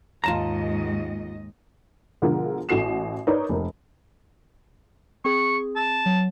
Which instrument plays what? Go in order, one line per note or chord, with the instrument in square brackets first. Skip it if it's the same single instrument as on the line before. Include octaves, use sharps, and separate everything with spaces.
[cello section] D#2 G#2 D#5 [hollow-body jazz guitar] F4 A5 A#5
[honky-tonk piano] B2 D3 F3 G#3 F4 A#4
A1 F#4 A4 C7 E7
D#4 A#4 B4 C#5 D5
F1 A#4
[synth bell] C4 G#4 [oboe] C#6
[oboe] A5
[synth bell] F#3